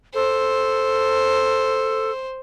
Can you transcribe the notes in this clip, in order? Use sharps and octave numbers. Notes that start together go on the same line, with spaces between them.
A4 C5